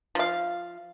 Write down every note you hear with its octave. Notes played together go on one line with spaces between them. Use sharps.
F3 F5